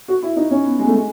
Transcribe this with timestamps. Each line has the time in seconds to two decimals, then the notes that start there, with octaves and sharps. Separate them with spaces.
0.08 F#4
0.23 E4
0.36 D#4
0.51 C#4
0.65 B3
0.79 G#3
0.87 A3
0.94 G#3